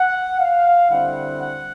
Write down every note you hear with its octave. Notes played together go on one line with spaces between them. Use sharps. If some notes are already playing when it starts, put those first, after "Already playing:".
Already playing: F#5
F5
D3 G3 C4 E4 F#5
F#5